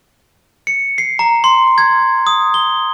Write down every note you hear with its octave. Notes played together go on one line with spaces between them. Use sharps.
C#7
C7
A#5
C6
G#6
D#6
G7